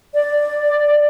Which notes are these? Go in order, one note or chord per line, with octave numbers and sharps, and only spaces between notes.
D5